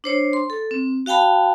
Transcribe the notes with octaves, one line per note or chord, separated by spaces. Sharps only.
D4 C5 C#5
C6
A4
C4
F#4 F5 G5 A5 B5